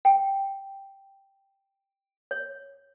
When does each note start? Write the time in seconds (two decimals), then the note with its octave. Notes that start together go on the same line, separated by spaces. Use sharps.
0.05 G5
2.31 C#5